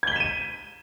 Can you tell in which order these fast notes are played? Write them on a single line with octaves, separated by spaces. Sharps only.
G#6 G7 B6 E7 D#7